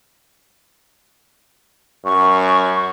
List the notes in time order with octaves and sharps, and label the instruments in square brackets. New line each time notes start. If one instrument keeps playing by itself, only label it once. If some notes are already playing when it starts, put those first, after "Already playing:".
[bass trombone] F#2 [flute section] C#6